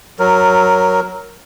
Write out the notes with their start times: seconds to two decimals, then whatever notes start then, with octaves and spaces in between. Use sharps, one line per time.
0.19 F#3 A#4